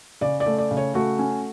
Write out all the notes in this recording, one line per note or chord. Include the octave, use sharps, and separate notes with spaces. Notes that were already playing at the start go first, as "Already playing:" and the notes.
C#3 D5
D5
A3
D5
C#3
C#5
A3 F#4
C#4